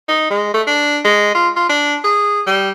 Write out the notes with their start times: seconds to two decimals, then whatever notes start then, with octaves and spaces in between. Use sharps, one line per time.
0.08 D#4
0.30 G#3
0.54 A3
0.67 D4
1.04 G#3
1.35 F4
1.56 F4
1.69 D4
2.04 G#4
2.47 G3